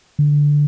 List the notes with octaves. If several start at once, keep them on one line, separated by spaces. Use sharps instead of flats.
D3